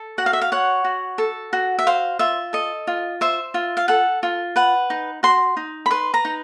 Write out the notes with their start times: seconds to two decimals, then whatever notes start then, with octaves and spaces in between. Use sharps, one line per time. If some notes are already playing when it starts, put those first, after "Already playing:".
Already playing: A4
0.18 F#4 F#5
0.26 F5
0.33 E5
0.41 F5
0.52 C#5 F#5
0.84 F#4
1.18 A4
1.53 F#4
1.79 E5
1.87 C5 F5
2.19 F4 E5
2.53 A4 D#5
2.87 F4
3.21 C5 E5
3.54 F4
3.77 F5
3.88 A4 F#5
4.23 F4
4.56 B4 F#5
4.90 D#4
5.23 F#4 C6
5.57 D#4
5.86 B5
5.91 B4 C6
6.14 A#5
6.25 D#4